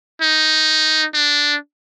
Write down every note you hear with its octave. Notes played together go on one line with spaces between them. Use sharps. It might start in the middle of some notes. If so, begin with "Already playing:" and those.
D#4
D4